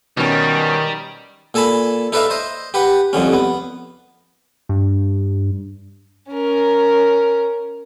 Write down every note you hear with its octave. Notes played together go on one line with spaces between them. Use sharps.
B2 D#3 G3 C#4
A#2 A4 G#5 A5 B5
D#4 A4 B4 D5 E5 F5
C5 D#5
G4 B4 F#5
C2 F2 D3 C#4
B3
G2
C#4 A#4